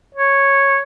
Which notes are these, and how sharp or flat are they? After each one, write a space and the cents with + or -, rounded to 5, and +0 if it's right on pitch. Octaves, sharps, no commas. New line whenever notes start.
C#5 -5